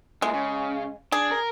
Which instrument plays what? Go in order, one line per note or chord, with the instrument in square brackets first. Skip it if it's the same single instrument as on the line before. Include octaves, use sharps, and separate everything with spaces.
[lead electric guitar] A#2 E4 [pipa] G#3
[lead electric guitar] C#3
[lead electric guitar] D4 [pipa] G#4
[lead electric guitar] A#4